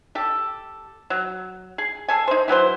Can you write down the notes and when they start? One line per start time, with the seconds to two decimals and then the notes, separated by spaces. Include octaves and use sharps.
0.15 G4 A4
1.10 F#3
1.78 G#4
2.08 G#4 A4 G#5
2.27 D#4 C5
2.48 E3 F#3 G#4 C5